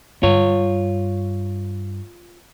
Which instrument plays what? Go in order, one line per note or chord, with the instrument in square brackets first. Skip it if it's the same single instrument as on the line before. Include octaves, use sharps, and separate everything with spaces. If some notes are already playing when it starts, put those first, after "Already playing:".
[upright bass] G2 [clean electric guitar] F4 C#5